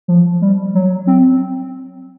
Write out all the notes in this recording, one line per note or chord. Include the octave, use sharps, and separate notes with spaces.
F3
G3
F#3
C4